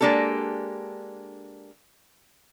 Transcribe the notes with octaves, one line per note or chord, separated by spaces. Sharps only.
G#3 A#3 D4 G4 A4